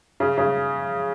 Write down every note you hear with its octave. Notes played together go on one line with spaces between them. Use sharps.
C#3
C#3